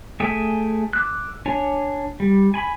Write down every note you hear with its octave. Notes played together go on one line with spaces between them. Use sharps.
A3 G#4 E5 G5 G#5
D6 E6 F#6
D4 C#5 G#5
G3
G#5 B5